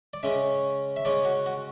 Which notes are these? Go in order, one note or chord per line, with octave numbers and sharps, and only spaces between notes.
D5
C#3 G#3 C#4 E5
E5
C#3 G#3 C#4 D5
F#4
F#4